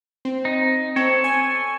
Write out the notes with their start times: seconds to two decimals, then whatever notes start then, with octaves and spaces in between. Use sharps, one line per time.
0.25 C4
0.45 D#4
0.96 C4 A4 C#5
1.24 G#5